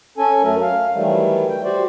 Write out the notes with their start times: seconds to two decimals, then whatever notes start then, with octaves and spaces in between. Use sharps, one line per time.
0.18 C#4 A4 G#5
0.42 F#2 F#3 A3 A#4
0.61 F5
0.94 D#3 E3 F#3 G3 A3
1.49 G5
1.64 F#4 G4 C5 D5